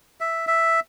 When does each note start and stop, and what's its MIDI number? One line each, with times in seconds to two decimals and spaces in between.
0.21 0.45 76
0.47 0.80 76